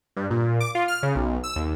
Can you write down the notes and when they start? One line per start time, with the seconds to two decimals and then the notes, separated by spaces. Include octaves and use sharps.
0.17 G2
0.30 A#2
0.60 D6
0.75 F4
0.88 F6
1.03 C#3
1.15 B1
1.44 E6
1.56 D#2